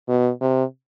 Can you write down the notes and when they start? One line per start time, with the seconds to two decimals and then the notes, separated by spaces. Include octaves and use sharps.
0.08 B2
0.41 C3